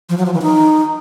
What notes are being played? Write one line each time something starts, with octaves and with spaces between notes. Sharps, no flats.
F3
F#3
F3
E3
D#4